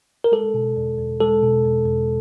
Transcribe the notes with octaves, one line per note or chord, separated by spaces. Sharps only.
A#4
G#3 A4
B2
E2
E2
G#3 A4
B2
E2
E2